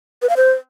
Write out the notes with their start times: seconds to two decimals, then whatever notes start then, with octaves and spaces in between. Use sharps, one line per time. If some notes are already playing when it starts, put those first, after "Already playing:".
0.22 B4
0.29 F5
0.37 C5